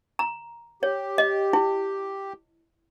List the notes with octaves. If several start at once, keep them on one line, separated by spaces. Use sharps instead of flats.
A#5
G4 C#5
D#5
E4